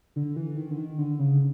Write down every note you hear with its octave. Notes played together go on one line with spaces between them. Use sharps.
D3
E3
D#3
D3
D#3
D3
C#3